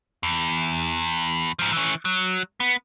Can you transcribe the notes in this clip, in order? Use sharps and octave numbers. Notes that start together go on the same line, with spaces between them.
E2
G#2 F3
E3 C#4
F#3
B3